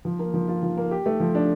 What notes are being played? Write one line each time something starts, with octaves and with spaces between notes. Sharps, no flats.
F3
A#3
F3
F4
F3
A#3
G4
A3
F3
D4